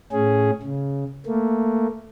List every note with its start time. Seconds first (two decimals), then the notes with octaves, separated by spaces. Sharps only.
0.12 A2 C#4 G#4
0.63 C#3
1.26 A3 A#3